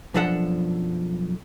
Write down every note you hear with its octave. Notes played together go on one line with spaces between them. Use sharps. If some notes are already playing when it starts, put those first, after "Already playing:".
B1 F#2 F3 D4 A4 F#5